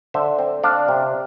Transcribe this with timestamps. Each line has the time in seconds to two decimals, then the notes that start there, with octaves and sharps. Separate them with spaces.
0.14 D3 C5 E5
0.39 C4
0.63 D4 D5 F5
0.88 C3